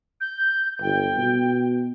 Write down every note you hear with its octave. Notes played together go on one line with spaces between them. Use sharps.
G6
G1 G5
B2